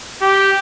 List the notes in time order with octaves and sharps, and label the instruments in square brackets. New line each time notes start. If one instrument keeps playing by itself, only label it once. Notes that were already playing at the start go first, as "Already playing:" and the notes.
[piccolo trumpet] G4